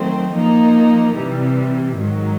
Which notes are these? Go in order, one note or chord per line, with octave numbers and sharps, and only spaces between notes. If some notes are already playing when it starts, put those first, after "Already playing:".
Already playing: D#3 F#3 A3 C4
F3 A#3 D#4
C3 E3 G3
G#2 D#3 F#3